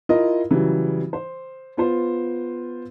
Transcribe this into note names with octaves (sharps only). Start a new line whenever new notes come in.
E4 F4 A#4 D#5
C#3 E3 F#3 G3
C5
B3 F4 C5